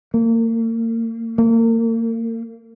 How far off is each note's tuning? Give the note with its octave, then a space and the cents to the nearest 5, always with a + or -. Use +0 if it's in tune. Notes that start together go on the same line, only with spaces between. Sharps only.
A#3 -35
A#3 -35